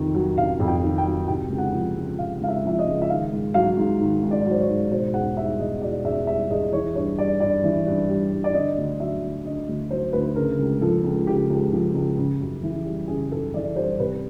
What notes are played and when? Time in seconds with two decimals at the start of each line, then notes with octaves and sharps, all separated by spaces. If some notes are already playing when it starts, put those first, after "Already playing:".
Already playing: F2 C3 D#3
0.15 F#3
0.37 C3 F5
0.60 F2
0.68 G5
0.83 D#3
0.98 G5
1.05 F#3
1.28 C3 G5
1.50 C#2
1.58 F#5
1.73 F3
1.96 C#2
2.19 C3 F5
2.42 C#2 F5
2.48 E5
2.64 F3 E5
2.79 D#5
2.87 C#2
3.02 E5
3.10 D#3 F5
3.32 G#2
3.54 F#3 F5
3.77 G#2
4.00 D#3
4.23 G#2
4.31 D5
4.45 F#3
4.51 C5
4.61 C#5
4.68 G#2
4.91 B2 C5
5.14 E2 F#5
5.37 G3 E5
5.59 E2 D#5
5.82 B2 D5
6.05 E2 E5
6.27 G3 E5
6.50 E2 D#5
6.72 E3 C#5
6.95 G2 C#5
7.18 G3 D5
7.40 G2 D5
7.64 E3
7.86 G2
8.10 G3
8.32 G2
8.44 D5
8.54 D3 D#5
8.78 D2
9.00 F#3 E5
9.23 D2
9.45 D3 D#5
9.68 D2
9.91 F#3 C5
10.13 D2 B4
10.36 C#3 A#4
10.59 C#2
10.81 F3 A4
11.04 C#2
11.27 C#3 G4
11.50 C#2
11.72 F3
11.94 C#2
12.18 C#3
12.41 F#2
12.63 E3
12.86 G3
13.08 C#3 G#4
13.31 F#2 A4
13.54 E3 D5
13.76 G3 C5
13.99 C3 B4